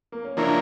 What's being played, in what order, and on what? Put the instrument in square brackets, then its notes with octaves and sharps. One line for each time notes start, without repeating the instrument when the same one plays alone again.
[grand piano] A#3
C#4
[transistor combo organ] F3 A#3 E4 A#4 C#5 [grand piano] D4